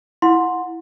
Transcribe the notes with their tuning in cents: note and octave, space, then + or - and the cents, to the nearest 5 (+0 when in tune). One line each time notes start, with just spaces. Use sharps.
E4 +0 F#5 -25 C6 +0